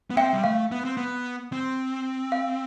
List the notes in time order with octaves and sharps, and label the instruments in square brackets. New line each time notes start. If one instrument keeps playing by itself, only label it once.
[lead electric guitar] B3
[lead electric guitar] C4 [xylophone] E5 G5
[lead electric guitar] G3
[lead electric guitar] A3 [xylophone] F5
[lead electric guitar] B3
C4
B3
C4
[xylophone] F5